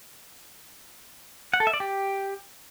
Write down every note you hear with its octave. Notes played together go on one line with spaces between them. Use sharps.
F#5
A4
E5
D5
G4